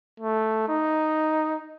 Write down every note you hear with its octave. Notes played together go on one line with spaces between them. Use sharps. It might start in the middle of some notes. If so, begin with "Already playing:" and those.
A3
D#4